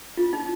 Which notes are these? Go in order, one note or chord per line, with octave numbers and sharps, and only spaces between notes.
F4
D#4